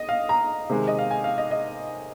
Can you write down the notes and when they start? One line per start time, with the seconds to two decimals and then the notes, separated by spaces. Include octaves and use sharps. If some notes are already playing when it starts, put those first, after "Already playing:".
Already playing: D#5
0.09 F5
0.29 A#5
0.70 C3 D#3 G#3
0.88 D#5
0.99 F5
1.11 G#5
1.24 F5
1.38 D#5
1.51 D#5